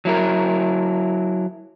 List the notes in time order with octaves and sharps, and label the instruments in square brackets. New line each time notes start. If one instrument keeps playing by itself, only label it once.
[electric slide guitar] F#3 E4 A#4